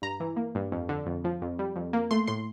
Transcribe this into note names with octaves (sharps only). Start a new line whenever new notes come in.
G2 A#5
E3
A#3
G2
F2
D3
F2
F3
F2
G3
F2
A#3
A3 C6
A2 C6